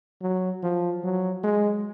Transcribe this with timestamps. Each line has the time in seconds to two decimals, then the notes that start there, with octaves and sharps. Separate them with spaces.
0.22 F#3
0.63 F3
1.04 F#3
1.44 G#3